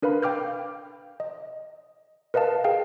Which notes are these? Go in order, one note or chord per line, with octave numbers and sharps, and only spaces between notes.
D4 A#4 B4 F5 B5
F5 G5 D6 F6 G6
D#5
A#4 B4 D#5 F5 A5
G#4 F5 G5